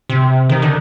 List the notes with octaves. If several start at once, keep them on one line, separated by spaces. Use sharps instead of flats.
C3
D#3
D3